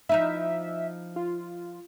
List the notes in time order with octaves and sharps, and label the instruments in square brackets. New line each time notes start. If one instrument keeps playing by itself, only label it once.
[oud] F3 D#4 E4 [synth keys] E5
[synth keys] F4